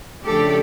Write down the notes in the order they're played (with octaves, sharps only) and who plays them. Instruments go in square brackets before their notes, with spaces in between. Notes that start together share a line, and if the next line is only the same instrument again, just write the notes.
[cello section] C#3 F3 A3 D4 G4 A4